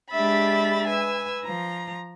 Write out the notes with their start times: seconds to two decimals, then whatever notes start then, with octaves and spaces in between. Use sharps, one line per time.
0.12 G#3 D4 G4 E5 B5 A6
0.87 B4 G#5 E6
1.45 F3 A#5